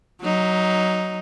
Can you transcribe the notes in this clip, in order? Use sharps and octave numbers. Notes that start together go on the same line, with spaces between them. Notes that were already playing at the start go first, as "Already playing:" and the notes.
F#3 D#4